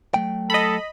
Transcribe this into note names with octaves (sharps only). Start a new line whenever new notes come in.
F#3 A3 G5
A4 D#5 B5